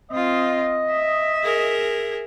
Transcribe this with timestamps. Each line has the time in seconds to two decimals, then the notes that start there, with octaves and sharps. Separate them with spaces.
0.12 C4 F4 D#5
0.91 E5
1.43 G#4 A#4